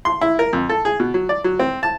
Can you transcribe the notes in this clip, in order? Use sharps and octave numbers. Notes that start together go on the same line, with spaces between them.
C6
E4
A#4
F2
A4
G#4
B2
F#3
D5
F#3
C4
A5